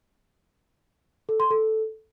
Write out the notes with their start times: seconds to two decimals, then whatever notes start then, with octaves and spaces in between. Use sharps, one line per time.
1.29 A4
1.40 C6
1.51 A4